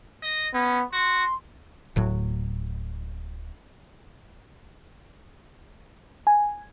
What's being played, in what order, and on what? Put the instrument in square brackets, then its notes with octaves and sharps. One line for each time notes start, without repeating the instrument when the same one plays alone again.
[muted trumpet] D#5
[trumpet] B3 [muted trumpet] C#4
[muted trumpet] F#4 [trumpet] C6
[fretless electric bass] D1 A2 F#3
[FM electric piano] G#5